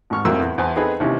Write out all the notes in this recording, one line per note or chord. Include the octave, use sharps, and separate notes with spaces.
G#1 G#2 C#6 F6
F2 A2 F#4 A#4 E6
E2
E2 E4 C5 G#5 A5
B3 C4 D#4 G#4 A4 B4
D#2 C3 E3 C#4